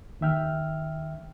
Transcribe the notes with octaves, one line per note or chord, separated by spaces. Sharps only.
D#2 D#3 E5 G5 F6